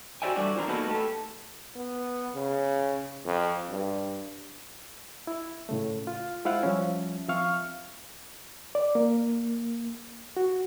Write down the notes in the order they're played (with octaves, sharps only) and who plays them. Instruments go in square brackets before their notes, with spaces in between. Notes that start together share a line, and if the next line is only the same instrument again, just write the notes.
[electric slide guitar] F#4 C5 D5 E5 G5 G#5
G2 E3 G3 A3 D4 F#4
E3 F3 C4 D4 A#4
A#3 B3 D#4 F#4 A4 B4
A3 G4 A4
[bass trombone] B3
C#3
F2
G2
[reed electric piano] E4
A2 C#3 A3
F4
G#3 E4 F4 C5 F5 F#5
F3 G3 C#4 E5
F3 C4 E5 F5 C#6 F6
D5
A#3
F#4